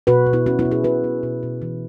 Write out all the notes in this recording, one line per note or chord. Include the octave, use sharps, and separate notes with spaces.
B2 F#4 B4
B2
B3 E4
B2 C#4 F#4
B3 E4
B2
E4 G#4
B2 F#4 B4
B3
B2
B2
E3